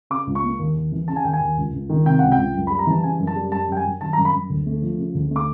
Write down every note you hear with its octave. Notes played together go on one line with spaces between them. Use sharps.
C#3 D6
C#2
C#6
A#3
D#2
D#2
E3
C#3 A5
G#5
D#2 G5
G#5
D#2
C#2
C#2
D#3
C3 G5
C#2 F#5
G5
C#2
F#2
G3 B5
A#5
E3 A5
C#3 G#5
F#2
A5
G3
F#2 A5
F#2 G5
G#5
F#3
D#3 A5
A#5
F#2
B5
F#2
D2
A3
F3
C#3
D2
A3
D6